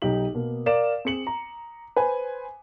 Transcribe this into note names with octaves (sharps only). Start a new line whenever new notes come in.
B1 D#4 G4 F#7
B2 A#3
A#4 D5 F5 E7
C4 G#4 C#7 F#7
A#5
B4 C5 G#5